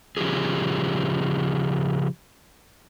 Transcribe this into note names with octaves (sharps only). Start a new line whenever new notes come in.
C#3 F3 C#4 G4 G#4